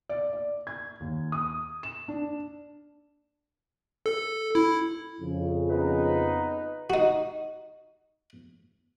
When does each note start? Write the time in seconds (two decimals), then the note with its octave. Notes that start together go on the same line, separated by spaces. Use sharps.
0.09 D5
0.33 D5
0.67 G#6
1.00 D#2
1.32 D#6
1.83 E7
2.08 D4
4.06 A4
4.55 E4
5.20 F2 C#3
5.69 B3 D#4 B4
6.90 D#4 F#4